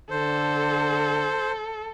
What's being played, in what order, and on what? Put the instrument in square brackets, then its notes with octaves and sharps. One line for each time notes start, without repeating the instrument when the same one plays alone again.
[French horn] D3 [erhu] A4 [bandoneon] C5